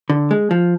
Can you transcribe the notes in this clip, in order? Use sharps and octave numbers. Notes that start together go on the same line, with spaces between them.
D3
G#3
F3